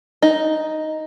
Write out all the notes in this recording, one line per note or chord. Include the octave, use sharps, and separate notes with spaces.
D#4